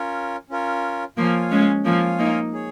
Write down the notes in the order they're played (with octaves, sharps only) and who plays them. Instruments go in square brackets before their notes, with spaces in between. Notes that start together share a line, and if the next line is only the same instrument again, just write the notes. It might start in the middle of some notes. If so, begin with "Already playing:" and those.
Already playing: [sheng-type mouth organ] C#4 F4 A#4 C#5
C#4 F4 A#4 C#5
[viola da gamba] F3 A#3 [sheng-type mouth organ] F4 C#5 F5 G#5
[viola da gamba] G#3 C#4
[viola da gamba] F3 A#3 [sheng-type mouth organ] F4 C#5 F5 G#5
[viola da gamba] A#3 D#4
[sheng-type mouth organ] G#4 C#5